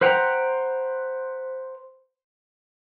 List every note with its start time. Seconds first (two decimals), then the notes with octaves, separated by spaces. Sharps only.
0.01 B4 C5 F#5 G5 A#5